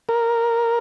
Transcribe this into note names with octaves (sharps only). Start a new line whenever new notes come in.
A#4